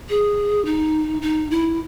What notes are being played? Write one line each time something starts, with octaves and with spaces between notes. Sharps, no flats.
G#4
D#4
D#4
E4